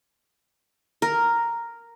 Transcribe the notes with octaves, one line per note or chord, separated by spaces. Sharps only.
A#4